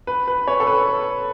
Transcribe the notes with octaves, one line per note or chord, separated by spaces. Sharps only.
B4
B4
C#5
A4
B4